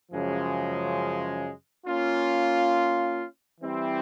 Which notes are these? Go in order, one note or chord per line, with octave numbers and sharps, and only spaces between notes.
F#2 C#3 F3 G#3
A#3 C#4 F4
E3 G3 C4 E4